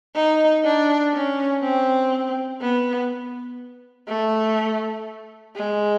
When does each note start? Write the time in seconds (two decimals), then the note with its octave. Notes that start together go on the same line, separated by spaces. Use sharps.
0.15 D#4
0.64 D4
1.13 C#4
1.63 C4
2.61 B3
4.08 A3
5.56 G#3